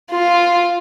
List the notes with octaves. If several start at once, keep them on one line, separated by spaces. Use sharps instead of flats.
F4